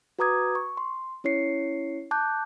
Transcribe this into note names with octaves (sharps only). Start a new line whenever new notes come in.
F#4 B4 A#5 D6 D#6 G#6
C#6
C6
C#4 E4 C#5 C7 C#7
A5 D6 F#6 G6